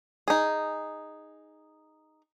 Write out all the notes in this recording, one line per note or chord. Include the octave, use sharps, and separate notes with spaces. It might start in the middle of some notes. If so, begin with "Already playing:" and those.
D#4 G#4